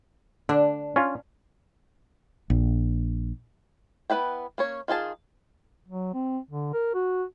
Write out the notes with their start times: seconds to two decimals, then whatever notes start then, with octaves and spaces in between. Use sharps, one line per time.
0.49 D3 D4
0.96 C#4 F4
2.50 A#1
4.10 B3 E4 B4 E5 G5
4.58 A#3 C#4 C#5
4.88 D#3 F4 G#4 A5
5.88 F#3
6.14 C4
6.50 D3
6.73 A#4
6.94 F#4